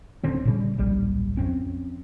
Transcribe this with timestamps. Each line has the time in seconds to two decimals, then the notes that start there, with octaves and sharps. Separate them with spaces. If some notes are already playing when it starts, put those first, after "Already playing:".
0.24 D1 D3 C4 C#4
0.45 A#2 C#3 G3
0.78 D1 A#1 G3
1.37 F2 C4 C#4